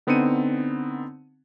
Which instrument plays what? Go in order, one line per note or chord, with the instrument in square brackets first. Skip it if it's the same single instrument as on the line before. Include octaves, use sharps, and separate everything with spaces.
[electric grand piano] D3 B3 C4 D#4 C#7 D#7